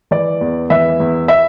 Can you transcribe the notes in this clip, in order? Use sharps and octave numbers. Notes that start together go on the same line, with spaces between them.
E3 D5
E2
E3 E5
E2
E5